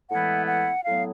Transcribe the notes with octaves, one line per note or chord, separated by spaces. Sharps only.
A2 E3 G#3 B3 E4 F#5
F#5
A2 F#3 B3 F5